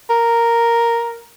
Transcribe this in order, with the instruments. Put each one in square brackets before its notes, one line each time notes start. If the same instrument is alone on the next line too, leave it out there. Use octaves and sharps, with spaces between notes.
[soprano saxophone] A#4